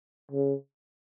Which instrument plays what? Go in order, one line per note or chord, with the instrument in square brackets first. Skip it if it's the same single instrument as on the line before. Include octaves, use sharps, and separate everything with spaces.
[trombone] C#3